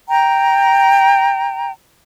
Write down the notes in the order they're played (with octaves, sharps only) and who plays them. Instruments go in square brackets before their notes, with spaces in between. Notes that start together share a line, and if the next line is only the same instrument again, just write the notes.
[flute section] G5 A#5